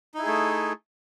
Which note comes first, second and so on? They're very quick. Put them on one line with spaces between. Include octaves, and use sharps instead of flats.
D#4 E4 G#4 A3